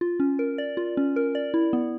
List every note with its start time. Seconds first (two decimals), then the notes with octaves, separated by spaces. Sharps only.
0.01 F4
0.20 C#4
0.39 A#4
0.58 D5
0.77 F4
0.97 C#4
1.16 A#4
1.35 D5
1.54 E4
1.73 B3